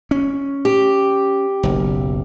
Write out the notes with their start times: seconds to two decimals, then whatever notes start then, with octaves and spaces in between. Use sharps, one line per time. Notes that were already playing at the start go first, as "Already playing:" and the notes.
0.11 C#4
0.65 G4
1.63 F#1 B1